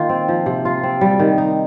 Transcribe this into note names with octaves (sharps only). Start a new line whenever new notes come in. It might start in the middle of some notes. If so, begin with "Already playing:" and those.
Already playing: D#3 A#3 F4
C4
F3
C3
F4
C4
G3
D#3
D#4